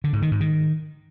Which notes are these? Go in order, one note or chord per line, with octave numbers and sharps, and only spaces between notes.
D3
G#2
D#3
G#2
D#3